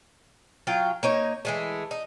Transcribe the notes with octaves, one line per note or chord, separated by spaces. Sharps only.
F#3 F4 G5
A#3 D#4 C#5
E3 G#3 A3
D#4